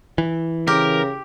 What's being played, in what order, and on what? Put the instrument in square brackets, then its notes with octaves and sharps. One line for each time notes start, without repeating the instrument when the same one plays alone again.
[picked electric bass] E3
[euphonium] C#3 [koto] G4 [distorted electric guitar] A#4